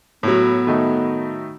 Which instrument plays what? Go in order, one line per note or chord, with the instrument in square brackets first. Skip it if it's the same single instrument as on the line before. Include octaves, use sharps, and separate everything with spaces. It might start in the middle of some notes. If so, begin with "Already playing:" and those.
[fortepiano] A2 F#3 [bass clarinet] B3
[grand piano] D#3 A3 D#4